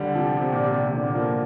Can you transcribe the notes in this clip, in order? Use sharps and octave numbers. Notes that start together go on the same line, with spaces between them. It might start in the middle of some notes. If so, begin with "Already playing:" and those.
Already playing: D3 G3
C3 F3
C3
A#2
C3
C3
A#2 D3
A#2
F3 A#3